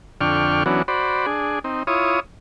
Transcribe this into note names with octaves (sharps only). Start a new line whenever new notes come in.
F2 D3 D4 G5 C#6 F6
E3 F#3 B3 C#4 D4 F#4
F#4 C5 D5 B5
D4 G#4
C4 D#4
E4 F4 C#5 D#6